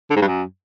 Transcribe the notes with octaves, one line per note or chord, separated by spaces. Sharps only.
D3
G#2
G2
F#2